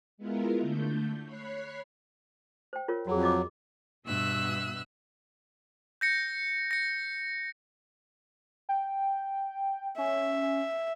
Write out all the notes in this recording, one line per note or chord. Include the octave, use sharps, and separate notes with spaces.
G#3 B3 E4 F4 A#4
D3 A3 G6
C#5 B5 F#6 C7
C5 G5
F4 A#4 C#5
F2 F#3 F#4 G#4
F4 D#5 D6
G2 B2 B3 E5 E6 F#6
G6 A#6 C#7
A#6 C#7
G5
C#4 E5